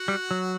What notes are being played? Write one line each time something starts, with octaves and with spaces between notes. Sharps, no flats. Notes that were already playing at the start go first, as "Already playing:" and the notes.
Already playing: F#4 F#5
G3
F#3